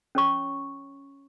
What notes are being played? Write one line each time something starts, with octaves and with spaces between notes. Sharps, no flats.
C#4 C#5 C#6